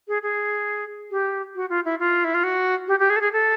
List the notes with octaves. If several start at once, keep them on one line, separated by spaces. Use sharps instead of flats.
G#4
G#4
G4
F#4
F4
E4
F4
E4
F4
F#4
G4
G4
G#4
A4
G#4
A4